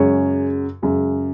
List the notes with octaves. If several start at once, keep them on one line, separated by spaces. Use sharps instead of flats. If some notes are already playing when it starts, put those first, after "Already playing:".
Already playing: F#2 C#3 G#3 C#5
F#2 C#3 G#3